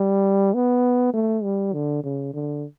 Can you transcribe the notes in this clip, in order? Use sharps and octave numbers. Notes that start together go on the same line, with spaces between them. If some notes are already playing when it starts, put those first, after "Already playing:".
Already playing: G3
B3
A3
G3
D3
C#3
D3